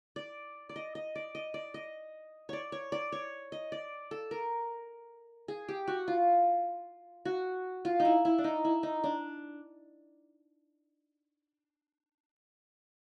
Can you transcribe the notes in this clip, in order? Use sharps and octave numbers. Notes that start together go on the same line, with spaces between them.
D5
D5
D#5
D#5
D5
D#5
D5
D#5
C#5 D5
C#5
D5
C#5
D#5
D5
A4
A#4
G#4
G4
F#4
F4
F#4
F4
D#4
E4
E4
D4
D#4
E4
D#4
D4